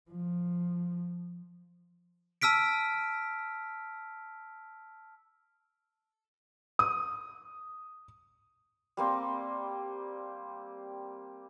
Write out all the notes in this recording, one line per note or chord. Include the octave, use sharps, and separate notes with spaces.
F3
A5 E6 F6 B6 D7
D#6
G3 A#3 C4